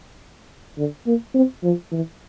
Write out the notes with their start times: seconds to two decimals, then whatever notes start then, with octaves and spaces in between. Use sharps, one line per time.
0.78 D3
1.07 A#3
1.35 C4
1.64 F3
1.92 E3